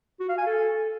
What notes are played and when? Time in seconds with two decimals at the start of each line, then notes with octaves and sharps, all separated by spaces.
0.20 F#4
0.29 F5
0.38 G#5
0.47 A4